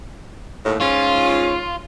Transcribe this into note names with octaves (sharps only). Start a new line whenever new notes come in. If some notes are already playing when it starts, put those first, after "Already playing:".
D#2 A2
G#2 C#4 F4 C#5